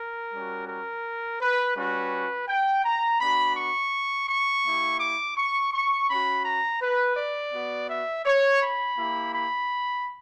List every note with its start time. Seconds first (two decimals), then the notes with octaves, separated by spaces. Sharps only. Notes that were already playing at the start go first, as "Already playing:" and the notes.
Already playing: A#4
0.33 G3 C#4 F#4
0.68 A#4
1.41 B4
1.76 G3 C#4 F#4 B4
2.48 G5
2.85 A#5
3.21 B3 D4 F#4 B5
3.57 C#6
4.29 C#6
4.65 A#3 E4 G4
5.00 D6
5.37 C#6
5.73 C#6
6.09 C#4 F#4 B5
6.45 A#5
6.81 B4
7.17 D5
7.53 B3 F#4
7.90 E5
8.26 C#5
8.62 B5
8.98 A#3 E4 G4
9.34 B5